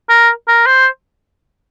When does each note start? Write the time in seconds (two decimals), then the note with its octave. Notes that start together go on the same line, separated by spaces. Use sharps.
0.09 A#4
0.48 A#4
0.67 C5